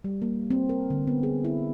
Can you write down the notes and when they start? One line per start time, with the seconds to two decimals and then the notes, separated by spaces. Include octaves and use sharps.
0.04 G3
0.22 A#3
0.50 C4
0.69 A#4
0.90 D3
1.07 B3
1.23 G#4
1.44 E4